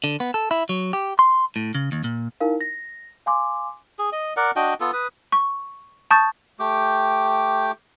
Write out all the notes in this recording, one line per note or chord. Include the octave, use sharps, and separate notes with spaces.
D3
B3
A4
E4
F#3
G4
C6
A2
C#3
D#2
A#2
D#4 E4 A#4 F5
A#6
F5 G#5 C6 D6
G#4
D#5
A#4 D5 F#5
D4 F#4 D#5 G5
B3 F4 A4
B4 D#6
C#6
A5 C#6 D#6 G6 A6
A3 G4 G5 D6